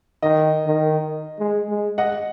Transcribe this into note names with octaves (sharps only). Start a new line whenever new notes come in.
D#3 D#5
D#3
G#3
G#3
D#5 F#5